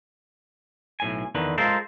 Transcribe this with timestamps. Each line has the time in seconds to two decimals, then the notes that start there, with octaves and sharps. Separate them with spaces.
1.00 B1 A2 G#5
1.35 E2 D3 D#3 B4
1.58 G#3 F4 A4 A#4 C5